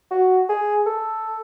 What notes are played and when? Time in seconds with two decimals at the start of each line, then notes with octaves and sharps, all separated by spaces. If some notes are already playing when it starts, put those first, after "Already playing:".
0.11 F#4
0.49 G#4
0.86 A4